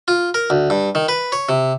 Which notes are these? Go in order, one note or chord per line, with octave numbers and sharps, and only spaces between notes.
F4
A#4
D2
G2
D#3
B4
C#5
C3